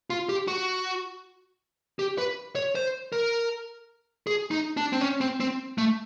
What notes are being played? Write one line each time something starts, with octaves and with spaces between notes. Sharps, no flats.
F4
G4
F#4
G4
B4
C#5
C5
A#4
G#4
D#4
D4
C4
C#4
C4
C4
A3